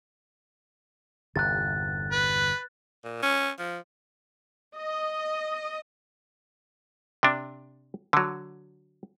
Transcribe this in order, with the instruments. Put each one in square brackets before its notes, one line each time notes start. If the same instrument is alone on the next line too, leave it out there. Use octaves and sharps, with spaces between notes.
[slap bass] G1 E2 C3 [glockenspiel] F#6 A6
[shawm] B4
[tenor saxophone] A#2
C#4
F3
[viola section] D#5
[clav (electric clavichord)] C3 D4
D3 F#3